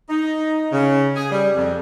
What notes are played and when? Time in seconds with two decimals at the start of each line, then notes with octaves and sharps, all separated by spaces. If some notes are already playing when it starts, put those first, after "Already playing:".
0.09 D#4
0.72 C#3
1.16 G#4
1.32 G3
1.56 F2